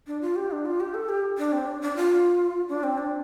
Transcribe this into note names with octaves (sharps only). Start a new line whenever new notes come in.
D4
F4
G4
D4
F4
G4
A4
G4
D4
C4
D4
D4
F4
D4
C4
D4